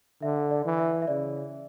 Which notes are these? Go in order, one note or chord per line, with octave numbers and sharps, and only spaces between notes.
D3 E5
D5
E3
E5
E5
C#3 D5